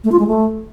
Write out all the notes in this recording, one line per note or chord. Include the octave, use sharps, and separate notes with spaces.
A3
F4
G#3
A3